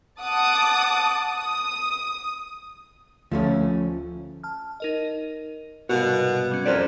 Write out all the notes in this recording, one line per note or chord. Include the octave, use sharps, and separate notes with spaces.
F#5 A5 D6 D#6
D#6
D2 F3 A3 C#4
A5 F6
D#4 A#4 D#5
C2 G#2 B2 F#4 A#4 F5
G3 C#4
F2 C#4 E4 A#4 C5 D5 D#7